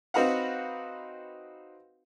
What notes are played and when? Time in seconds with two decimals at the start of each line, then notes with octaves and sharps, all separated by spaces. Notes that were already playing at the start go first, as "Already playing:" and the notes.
0.14 C4 D#4 F#4 B4 F5 F#5